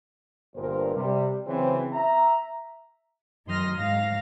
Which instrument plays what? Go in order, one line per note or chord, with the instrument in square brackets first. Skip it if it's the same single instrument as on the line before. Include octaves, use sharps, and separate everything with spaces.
[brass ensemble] G1 G2 A#2 G3 A#4 C5
C3 G3
C#3 E3 F#3 C4
E5 A#5
[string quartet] F#2 D#3 C6 D#6 F6 A#6
G#2 F5 A#6